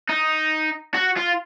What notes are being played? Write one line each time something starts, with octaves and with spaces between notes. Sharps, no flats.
D#4
F#4
F4